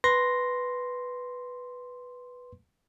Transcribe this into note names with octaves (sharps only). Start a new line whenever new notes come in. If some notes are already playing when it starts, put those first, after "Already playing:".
B4 C6 A#6